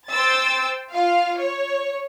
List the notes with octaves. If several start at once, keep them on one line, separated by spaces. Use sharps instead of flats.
C5 G5 E6 A6
F4 F5
C#5